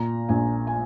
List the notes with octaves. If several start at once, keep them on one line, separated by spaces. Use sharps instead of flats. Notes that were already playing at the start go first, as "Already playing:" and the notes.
Already playing: A#2 A#5
A#1 G#5
G#5